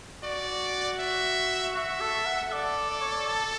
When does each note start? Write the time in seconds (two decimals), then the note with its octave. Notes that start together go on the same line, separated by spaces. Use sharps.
0.23 F#4 D5
0.99 E5
1.76 F#4 E5
2.01 A4
2.26 F#5
2.52 A4 D5
2.90 D5
3.01 C#5
3.12 D5
3.28 A5